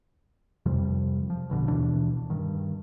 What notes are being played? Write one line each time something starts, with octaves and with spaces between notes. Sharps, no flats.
F2 C3 F3 G3
F3
A1 B2 D3
D#2 B2 E3 D4
G2 D#3